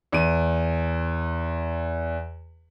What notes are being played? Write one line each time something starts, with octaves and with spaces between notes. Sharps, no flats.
E2 D#7